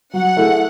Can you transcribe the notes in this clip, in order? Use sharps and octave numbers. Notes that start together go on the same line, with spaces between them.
F#3 F#5
A3 E4 G#4